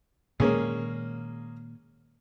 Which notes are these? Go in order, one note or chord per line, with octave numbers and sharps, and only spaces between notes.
A#2 D#3 G#3 A#3 C#4 G#4